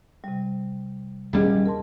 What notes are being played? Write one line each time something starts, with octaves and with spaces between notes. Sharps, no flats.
C3 G3
D#1 D#2 G3 C#4 G#4 D#5
A#4 A5 C6